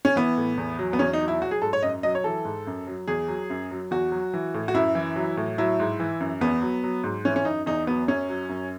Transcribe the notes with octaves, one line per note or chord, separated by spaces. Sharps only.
C#4
E3 B3
A2
E2
F#3
B3
E2 C#4
D#4
F#3
E4
F#3 F#4
G#4
G#2 A4
C#5
F#2 D#5
F#3 D#5
C#5
E3 A4
G#2
F#2
F#3
E2 G#4
F#3
F#2
F#3
E2 F#4
F#3
E3
A2
F#4
F#2 E4
E3
F#3
A2
F#3 E4
G#2
E3
F#2
E2 B3
F#3
F#3
G#2
E3 C#4
C#4
F#2 D#4
E2 D#4
F#3 B3
F#2 C#4
F#3
F#2